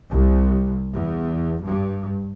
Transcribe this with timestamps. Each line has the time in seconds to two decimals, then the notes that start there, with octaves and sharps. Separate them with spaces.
0.11 C2
0.94 E2
1.62 G2